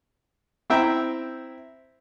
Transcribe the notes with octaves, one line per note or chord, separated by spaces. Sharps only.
C4 E4 E5 G5 A#5